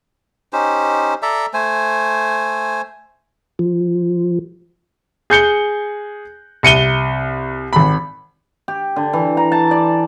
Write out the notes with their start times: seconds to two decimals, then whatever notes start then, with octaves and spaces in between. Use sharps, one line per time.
0.53 C#4 D#4 G4 C5
1.22 A4 D5 E5 A#5
1.54 A3 C5 G#5
3.59 F3
5.30 G#4 G6 C#7 G7
6.63 C2 C#7 D#7 G7
7.73 G#1 B5
8.68 G4
8.96 D3
9.13 E3
9.37 A#5
9.52 A5
9.71 D5